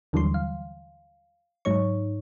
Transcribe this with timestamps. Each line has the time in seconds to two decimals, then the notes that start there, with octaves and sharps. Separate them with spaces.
0.13 D#2 D3 E3 F#3 G3 C6
0.34 F5
1.65 G#2 F#3 D#4 C#5 C#6